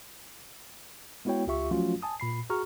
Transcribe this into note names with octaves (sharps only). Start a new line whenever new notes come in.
G#3 B3 E4 F#4 C#5 G5
C#2 F4 G4 E5 C#6
F3 F#3 A3 C#4 F4 F#4
G#5 A5 D#6
A#2 B5 C7
F#4 G#4 A#5 C#6 F6